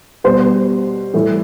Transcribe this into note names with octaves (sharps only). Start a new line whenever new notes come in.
B2 G3 C5
A2 E3 G3